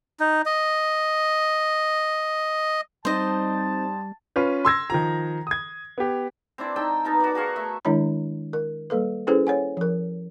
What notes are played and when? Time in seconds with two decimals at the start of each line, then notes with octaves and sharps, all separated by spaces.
0.20 D#4
0.46 D#5
3.05 G3 C4 D#4 C5 D#5 A5
4.36 C#4 F4 B4
4.65 C6 E6 G#6 A#6
4.90 D#3 F3 A#5
5.47 D#6 G#6
5.98 B3 G4
6.58 C4 D4 E4 D5
6.76 D#4 G5 A5 E6
7.05 B3 D#4 A#4 A5
7.20 F#4 D5
7.35 F#4 G#4 F5 C#6
7.56 A3 E5
7.85 D#3 G#3 D4 E4 C#5 B5
8.53 A#4
8.90 G3 A#3 A4 B4
9.27 C#4 E4 G#4 A4 B4 C5
9.47 C#5 F#5 G#5
9.77 F3 A#4